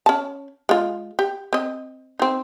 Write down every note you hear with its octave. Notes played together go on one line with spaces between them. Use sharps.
C#4 A5
G#3 F4
G4
C4 D#5
C4 D#4